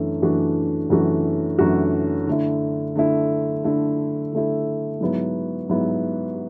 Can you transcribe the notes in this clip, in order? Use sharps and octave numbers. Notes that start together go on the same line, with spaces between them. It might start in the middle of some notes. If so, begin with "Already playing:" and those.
Already playing: F#2 E3 A3 D4
F#2 E3 A3 D4 F#4
F#2 E3 A3 D4 F#4
F#2 E3 A3 D4 F#4
D3 A3 E4
D3 A3 E4
D3 A3 E4
D3 A3 E4
G#2 F#3 B3 E4
G#2 F#3 B3 E4